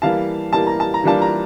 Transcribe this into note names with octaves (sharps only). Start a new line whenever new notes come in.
E3 G3 A#3 F5 A5
E3 G3 A#3 A5
A#5
A5
A#5
E3 G3 A#3 D4 F4 A5
A#5